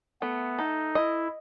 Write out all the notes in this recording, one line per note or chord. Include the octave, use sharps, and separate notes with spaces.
A3 B3
D#4 A4
E4 D#5